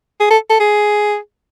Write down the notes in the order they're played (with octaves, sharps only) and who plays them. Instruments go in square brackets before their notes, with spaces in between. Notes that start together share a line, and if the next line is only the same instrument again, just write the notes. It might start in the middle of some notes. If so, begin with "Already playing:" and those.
[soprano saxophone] G#4
A4
A4
G#4